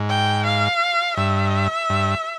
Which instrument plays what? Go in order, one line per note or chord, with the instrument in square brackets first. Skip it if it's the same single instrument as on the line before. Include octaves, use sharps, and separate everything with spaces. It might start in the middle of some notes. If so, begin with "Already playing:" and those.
Already playing: [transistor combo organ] G#2
[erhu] G5
F5
[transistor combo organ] G2 [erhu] E5
[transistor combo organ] G2